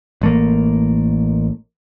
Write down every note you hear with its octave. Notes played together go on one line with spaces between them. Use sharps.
A1 A3 A#3